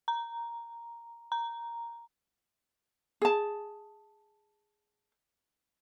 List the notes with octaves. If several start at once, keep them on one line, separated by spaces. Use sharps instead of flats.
A#5
A#5
G#4 A5